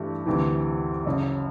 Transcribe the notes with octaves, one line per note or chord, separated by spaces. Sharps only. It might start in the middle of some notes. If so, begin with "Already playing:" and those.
Already playing: G2 E3 A3
D2 C3 E3
F#1 F#2 C#3